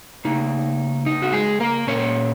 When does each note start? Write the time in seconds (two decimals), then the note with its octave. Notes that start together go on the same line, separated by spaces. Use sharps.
0.25 C#3 A#3 D#4
1.06 D#4
1.22 F#4
1.33 G#3 G#4
1.60 A#3 A#4
1.87 A#2 A#3 C#4 C#5